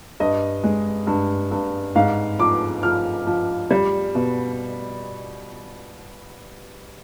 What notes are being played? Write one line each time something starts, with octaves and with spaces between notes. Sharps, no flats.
G2 D#5
G#3
G2
G2
G#2 F5
F3 D6
F3 F6
F3
G3
B2